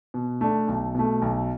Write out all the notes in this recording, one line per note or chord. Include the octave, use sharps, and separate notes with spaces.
B2
A3 D4
B1
B2 A3
B1